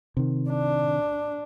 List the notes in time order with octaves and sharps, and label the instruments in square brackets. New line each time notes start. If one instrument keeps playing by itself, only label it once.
[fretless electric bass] C3 D#3
[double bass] D4